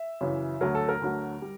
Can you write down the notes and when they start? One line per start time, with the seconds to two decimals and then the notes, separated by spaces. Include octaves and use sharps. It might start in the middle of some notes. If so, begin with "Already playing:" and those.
Already playing: E5
0.21 F#2 C#3 E3
0.61 D2 D3 F#3 A#4
0.75 A4
0.89 A#4
1.02 D2 D3 F#3
1.42 G3